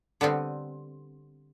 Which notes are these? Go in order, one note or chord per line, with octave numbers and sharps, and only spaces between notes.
D3 G3 B3 C4